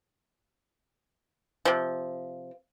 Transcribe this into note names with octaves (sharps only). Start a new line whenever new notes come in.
C3 F3